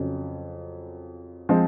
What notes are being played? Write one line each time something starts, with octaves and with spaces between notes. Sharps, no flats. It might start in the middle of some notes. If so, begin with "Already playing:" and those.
Already playing: F2 C#3 F#3 C#4
F3 G#3 C4